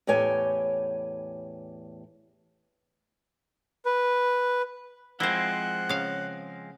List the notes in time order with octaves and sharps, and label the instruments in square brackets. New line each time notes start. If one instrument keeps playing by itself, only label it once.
[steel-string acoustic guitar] E2 A2 G4 C#5 G#5
[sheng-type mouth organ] B4
[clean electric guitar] F3 G#3 C4 [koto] E4 C5 [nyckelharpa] F#5
[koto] C#3 F5